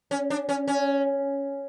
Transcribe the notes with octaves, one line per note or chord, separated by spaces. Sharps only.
C#4
D4
C#4
C#4